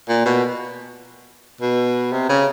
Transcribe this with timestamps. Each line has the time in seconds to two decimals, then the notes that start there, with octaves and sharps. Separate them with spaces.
0.08 A#2
0.25 B2
1.61 B2
2.12 C3
2.29 C#3